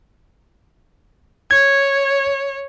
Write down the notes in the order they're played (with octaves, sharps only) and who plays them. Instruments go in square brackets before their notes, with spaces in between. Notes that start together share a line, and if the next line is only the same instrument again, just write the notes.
[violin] C#5 [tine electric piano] G#6